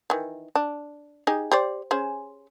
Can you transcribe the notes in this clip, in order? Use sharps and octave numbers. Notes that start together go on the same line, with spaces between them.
D#3 E3
D4
D#4 G4 G#4
G4 C5 D5
C#4 G#4 C5